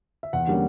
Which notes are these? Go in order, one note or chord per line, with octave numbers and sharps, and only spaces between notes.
E5
E2 F#5
D3 G3 A#3 C#4